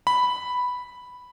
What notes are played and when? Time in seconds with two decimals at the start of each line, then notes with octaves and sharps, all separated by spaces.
0.07 B5